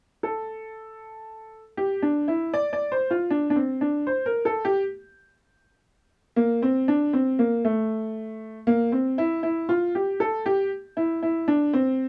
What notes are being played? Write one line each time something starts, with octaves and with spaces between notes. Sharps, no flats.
A4
G4
D4
E4
D5
D5
C5
F4
D4
D4
C4
D4
C5
A#4
A4
G4
A#3
C4
D4
C4
A#3
A3
A#3
C4
E4
E4
F4
G4
A4
G4
E4
E4
D4
C4